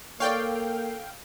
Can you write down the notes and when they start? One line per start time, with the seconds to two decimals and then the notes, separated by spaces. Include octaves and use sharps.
0.20 A#3 A4 C#5 D5 F5 G5